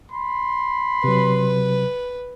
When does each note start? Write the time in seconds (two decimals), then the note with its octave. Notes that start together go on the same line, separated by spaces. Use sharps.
0.12 B5 C6
1.04 C3 F#3 B4